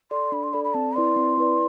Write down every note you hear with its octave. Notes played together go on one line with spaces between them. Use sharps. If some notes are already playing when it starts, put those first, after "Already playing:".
A4 D5 C6
D4 B5
C6
A4 D5 B5
B5
C4 A5
E4 B4 D5 C6
C4
E4 B4 D5